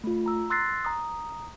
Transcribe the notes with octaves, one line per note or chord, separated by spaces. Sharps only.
A3 F4
A#5 E6
C6 E6 F#6 A6 A#6 C7
A#5 D#6